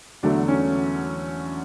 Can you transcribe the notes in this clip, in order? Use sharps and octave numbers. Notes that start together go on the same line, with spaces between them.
E2 D3 F#3 A3 D4
C#4